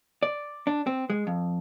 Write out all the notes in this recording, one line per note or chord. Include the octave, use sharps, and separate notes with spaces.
D5
D4
C4
G#3
F2